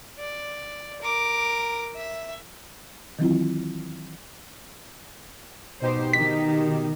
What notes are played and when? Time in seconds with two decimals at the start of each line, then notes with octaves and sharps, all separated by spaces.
0.19 D5
1.02 A#4 D6
1.95 E5
3.19 D#3 E3 F#3 C4 E4 F4
5.81 B2 D#4 G4 C5
6.13 D#3 B6